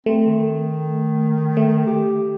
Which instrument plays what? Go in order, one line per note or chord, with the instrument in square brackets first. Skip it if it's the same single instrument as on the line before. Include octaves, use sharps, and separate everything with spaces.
[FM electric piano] A3 [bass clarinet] C4
[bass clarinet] D#3
[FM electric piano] A3
[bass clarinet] G4